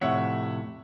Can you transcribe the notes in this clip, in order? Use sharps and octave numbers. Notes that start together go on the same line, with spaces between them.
F2 A2 C3 C#5 E5 F#5